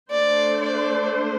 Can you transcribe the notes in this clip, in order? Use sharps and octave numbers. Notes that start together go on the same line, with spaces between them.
A3 D4 C5 D5
D5